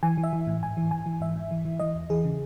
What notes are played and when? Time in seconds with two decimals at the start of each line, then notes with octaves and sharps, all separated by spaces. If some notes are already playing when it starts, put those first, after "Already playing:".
0.03 E3 G#5
0.18 E3
0.24 E5
0.33 E3
0.47 A2
0.63 G#2 G#5
0.77 E3
0.91 E3 G#5
1.06 E3
1.21 G#2 E5
1.36 G#2
1.51 E3
1.65 E3
1.80 E3 D#5
1.95 E2
2.10 E3 G#4
2.24 C#3